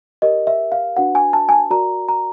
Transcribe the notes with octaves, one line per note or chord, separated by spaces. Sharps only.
G4 A#4 C#5 D#5
E5
F5
D4 F#4 B4 F#5
G#5
A5
G#5
A5
F#4 A#4 D5 A#5
A#5